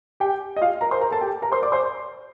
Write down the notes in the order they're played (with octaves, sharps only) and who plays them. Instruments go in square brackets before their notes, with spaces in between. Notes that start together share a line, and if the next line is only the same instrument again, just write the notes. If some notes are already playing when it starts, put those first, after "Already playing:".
[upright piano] G4 G5
D#5
F4 F5
A#4 A#5
C5 C6
A#4 A#5
A4 A5
G4 G5
A#4 A#5
C5 C6
D5 D6
C5 C6